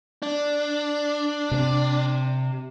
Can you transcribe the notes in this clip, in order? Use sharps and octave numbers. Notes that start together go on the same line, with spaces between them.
D4
C3 C4